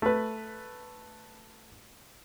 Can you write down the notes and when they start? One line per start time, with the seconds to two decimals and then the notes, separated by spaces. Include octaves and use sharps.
0.02 A3 B4